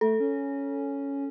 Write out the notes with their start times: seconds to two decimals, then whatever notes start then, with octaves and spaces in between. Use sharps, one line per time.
0.01 A3 A4
0.20 C#4